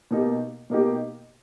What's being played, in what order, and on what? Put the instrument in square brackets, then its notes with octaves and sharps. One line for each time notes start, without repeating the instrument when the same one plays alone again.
[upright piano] B2 A#3 D#4 G4
B2 A#3 D#4 G4